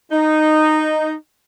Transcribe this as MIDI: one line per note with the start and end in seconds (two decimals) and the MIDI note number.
0.11 1.14 63